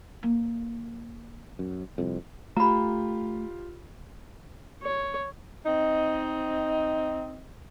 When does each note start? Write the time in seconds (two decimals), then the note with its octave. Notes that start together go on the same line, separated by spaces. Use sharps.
0.23 A#3
1.59 F#2
1.98 C2 F2
2.57 A3 F4 G4 A#5 B5
4.82 C#5
5.66 C4 D#4 D#5